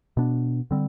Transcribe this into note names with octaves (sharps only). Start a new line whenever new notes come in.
B2 B3 D4
D3 G3 C4